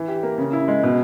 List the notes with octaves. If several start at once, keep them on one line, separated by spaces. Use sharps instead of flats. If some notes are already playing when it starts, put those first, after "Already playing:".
Already playing: E3
G4
A#3
C#3
E4
G#3
B2